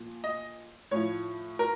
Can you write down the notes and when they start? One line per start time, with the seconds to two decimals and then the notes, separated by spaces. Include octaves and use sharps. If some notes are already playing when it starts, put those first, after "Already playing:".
Already playing: A#2 F3
0.24 D#5
0.91 A2 F3 C#5
1.59 A#4